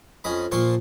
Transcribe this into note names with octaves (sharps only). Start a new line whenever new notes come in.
F2 C#4 D#5 B5
A#2 F3 A#3 C6 C#6